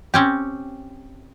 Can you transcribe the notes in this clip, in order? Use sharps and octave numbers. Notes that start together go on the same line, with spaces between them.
C4 C#4 G4